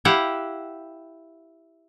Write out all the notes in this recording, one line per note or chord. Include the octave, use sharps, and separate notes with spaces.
E4 G4 F5 F#5